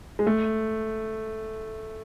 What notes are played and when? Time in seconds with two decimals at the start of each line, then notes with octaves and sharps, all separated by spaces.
0.19 G#3
0.27 A3